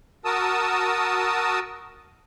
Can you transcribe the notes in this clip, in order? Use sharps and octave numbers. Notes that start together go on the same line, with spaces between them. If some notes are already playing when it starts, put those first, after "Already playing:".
F#4 A#4 A5 D#6 E6